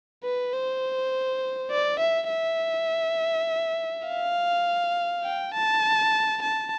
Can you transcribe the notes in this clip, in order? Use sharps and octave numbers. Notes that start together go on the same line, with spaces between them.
B4
C5
D5
E5
E5
F5
G5
A5
A5